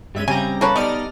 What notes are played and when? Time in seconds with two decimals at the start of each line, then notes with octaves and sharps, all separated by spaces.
0.15 G2 G3 G#3 C#4 E5 D#7
0.28 C#3 G3 C4 G4 G#5 A#5
0.61 A#3 C#4 A4 B4 A5
0.76 G3 B3 D#4 D5 D#5 F6